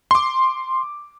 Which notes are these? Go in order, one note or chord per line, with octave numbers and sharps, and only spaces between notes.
C6 D6